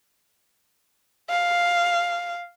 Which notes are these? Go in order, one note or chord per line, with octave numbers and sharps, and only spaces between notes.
F5